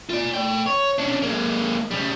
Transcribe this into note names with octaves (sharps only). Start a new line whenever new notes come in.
F4 D5
A3 G5
C#5
C#4 D4
G#3 A#3
C#3 G3